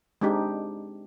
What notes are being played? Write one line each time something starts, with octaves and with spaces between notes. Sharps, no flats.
G#3 C4 D4 D#4 G4